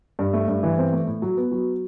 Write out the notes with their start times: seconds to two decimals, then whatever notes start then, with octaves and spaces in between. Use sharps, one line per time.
0.19 G2
0.33 A3
0.48 G2
0.63 E3
0.78 C4
0.92 A3
1.07 A2
1.22 F#3
1.37 B3
1.51 F#3